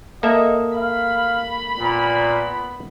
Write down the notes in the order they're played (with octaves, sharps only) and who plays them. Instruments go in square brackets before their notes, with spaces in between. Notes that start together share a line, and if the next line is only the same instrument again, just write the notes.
[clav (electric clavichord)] A#3 A4 E5 [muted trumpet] D#5
[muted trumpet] F5 [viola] B5
[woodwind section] A#2 [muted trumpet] B3